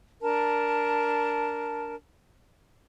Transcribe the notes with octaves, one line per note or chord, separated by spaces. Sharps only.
D4 A#4 A5